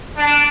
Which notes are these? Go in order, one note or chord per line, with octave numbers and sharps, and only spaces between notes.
D4